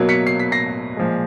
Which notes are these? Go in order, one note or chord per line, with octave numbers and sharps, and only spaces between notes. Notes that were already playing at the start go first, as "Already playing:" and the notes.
Already playing: B2 F#3 A#3
B6 C#7
C7
B6
A#6 C7
A#2 F3 G#3